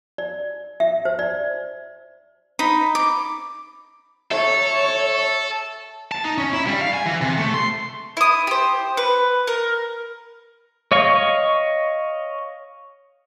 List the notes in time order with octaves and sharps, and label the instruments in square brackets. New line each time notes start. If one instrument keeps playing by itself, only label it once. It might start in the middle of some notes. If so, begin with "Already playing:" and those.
[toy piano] D5
E5
C5
D5
[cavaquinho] D#4 B5
D6
[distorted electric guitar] A4 [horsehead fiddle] C#5 [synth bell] E5
[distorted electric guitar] A5
D#4
C#4
E4
G3
F5
G#5
E3
C3
A3
C6
[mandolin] E4 D#6
G4 C5
B4
A#4
[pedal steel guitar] C#5 D#5 F5 C#6